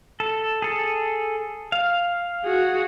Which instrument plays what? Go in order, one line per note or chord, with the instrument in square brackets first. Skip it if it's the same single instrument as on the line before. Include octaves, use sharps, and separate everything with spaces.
[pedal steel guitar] A4
G#4 A4
F5
[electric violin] F#4 G#4